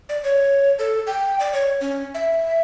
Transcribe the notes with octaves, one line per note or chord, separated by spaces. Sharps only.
D5
C#5
A4
G5
D5
C#5
C#4
E5